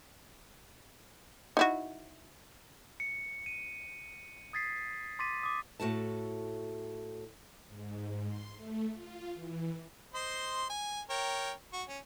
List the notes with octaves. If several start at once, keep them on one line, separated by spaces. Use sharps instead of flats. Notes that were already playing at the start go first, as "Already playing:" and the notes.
D#4 E4 F#4
C#7
D#7
D#6 G#6 A6 B6 C7
C6 D6 A6 B6 D#7
D6 D#6
A2 F#4 A4 A5
G#2
C6
A3
F4
E3
C5 D#5 C6
G#5
A#4 C#5 G5
F#4
C#4